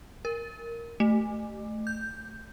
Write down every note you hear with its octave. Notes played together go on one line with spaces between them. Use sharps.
A#4
A3
G6